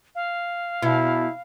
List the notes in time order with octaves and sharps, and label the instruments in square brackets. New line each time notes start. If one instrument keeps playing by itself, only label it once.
[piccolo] F5
[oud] B2 [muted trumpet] E4